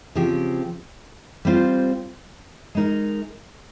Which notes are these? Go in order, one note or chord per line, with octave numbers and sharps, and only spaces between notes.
C#3 F3 C4 G4
G3 C4 F4 C5
G#3 D#4 A#4 D#5